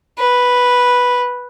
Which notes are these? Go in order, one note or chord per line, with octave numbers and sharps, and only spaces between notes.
B4